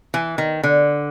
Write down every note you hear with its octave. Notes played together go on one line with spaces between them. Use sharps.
E3
D#3
D3